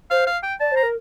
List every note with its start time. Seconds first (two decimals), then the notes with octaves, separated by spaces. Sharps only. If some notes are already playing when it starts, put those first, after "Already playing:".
0.10 C5 F5
0.27 F5
0.43 G5
0.60 D5 A5
0.71 C5
0.76 A#5
0.82 A#4